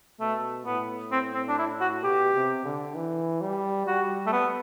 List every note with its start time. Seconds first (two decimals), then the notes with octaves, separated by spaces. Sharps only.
0.21 B2 A3
0.66 A2 B3
1.12 C4
1.34 C4
1.49 D4
1.59 E4
1.81 F#4
2.04 B2 G4
2.34 C3
2.64 D3
2.95 E3
3.41 G3
3.86 G3 F#4
4.27 A3
4.33 B3